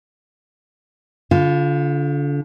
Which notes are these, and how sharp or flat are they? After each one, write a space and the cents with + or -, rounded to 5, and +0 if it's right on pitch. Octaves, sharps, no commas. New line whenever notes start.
D3 -35 F4 +0